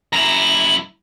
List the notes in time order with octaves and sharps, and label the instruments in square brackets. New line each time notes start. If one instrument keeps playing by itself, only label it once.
[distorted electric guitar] F#2 E4 [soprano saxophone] A#5